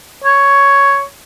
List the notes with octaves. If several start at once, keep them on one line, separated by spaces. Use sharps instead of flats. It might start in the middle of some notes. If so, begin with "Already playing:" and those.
C#5